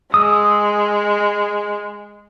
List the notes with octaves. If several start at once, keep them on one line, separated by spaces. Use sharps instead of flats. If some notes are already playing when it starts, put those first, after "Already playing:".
G#3 D#6 E6